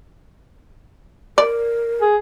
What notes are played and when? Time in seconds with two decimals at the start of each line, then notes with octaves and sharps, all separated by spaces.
1.38 A#4 D5
2.01 G#4